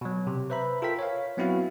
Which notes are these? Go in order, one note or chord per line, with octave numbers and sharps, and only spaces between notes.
B2 F#3
C3
B4 C5 E5 A#5 B5
F4 A4 A#4 G5 B6
C#5 F5
F#3 B3 C4 E4 F#4 F5